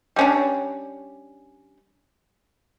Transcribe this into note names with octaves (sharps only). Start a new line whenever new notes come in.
G3 C#4 D4